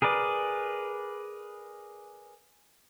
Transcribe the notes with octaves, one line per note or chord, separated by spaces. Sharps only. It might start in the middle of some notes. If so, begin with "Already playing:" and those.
G#4 A#4 B4 D5